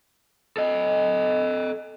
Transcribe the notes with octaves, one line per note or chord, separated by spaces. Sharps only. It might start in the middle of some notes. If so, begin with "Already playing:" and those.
A4 D#5